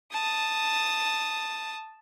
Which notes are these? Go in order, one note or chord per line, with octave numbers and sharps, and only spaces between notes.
A5 D#6